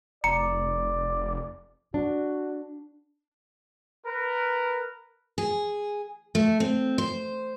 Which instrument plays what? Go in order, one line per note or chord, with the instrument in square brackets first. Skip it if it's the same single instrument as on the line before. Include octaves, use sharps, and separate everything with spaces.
[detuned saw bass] F1 [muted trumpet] D5 [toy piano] A#5 [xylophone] C#7
[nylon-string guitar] D4 [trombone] F#4
[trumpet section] A#4 B4
[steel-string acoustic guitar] G#4
A3
C4
C5